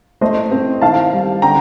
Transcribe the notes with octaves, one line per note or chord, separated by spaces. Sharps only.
A3 C5 D#5
C4
D#3 F5 A5
G3
D3 G5 A#5